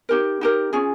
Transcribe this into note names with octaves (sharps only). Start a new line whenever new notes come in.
D#4 G4 A#4
D#4 G4 A#4
C#4 F4 G#4